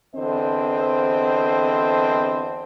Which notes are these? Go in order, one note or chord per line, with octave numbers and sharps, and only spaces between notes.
E2 D3 C4 C5 D#5